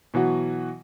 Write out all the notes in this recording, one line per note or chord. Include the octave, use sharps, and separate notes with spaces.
B2 E3 F#3 F#4